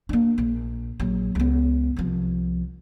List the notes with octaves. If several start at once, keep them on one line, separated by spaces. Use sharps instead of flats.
A#3 D4
A#1
A#1 F#3
C#2 B3
C2 F3